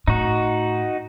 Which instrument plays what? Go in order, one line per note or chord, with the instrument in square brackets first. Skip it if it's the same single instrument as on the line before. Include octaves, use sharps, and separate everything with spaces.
[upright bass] A2 [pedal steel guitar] D#4 F#4